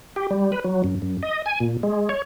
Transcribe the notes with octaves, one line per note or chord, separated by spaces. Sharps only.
G4
G3
B4
F#3
F#2
F#2
D#5
G#5
A#2
G#3
C#5